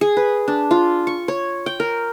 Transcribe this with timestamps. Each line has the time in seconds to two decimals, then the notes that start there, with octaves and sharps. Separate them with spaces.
0.01 G#4
0.17 B4
0.48 D4
0.71 F4
1.07 C#6
1.28 C#5
1.66 G5
1.80 A#4